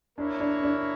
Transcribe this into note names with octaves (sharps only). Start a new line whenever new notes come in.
A#3 D4 E4 A#4 C#5
D4
D4